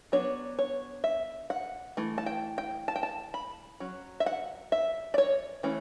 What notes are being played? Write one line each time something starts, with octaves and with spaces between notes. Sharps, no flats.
F#3 B3 D4 C#5
C#5
E5
F#5
E3 A3
A5
G5
G5
A5
G5
A5
B5
F#3 C#4
E5
F#5
E5
D5
C#5
E3 A3 C#4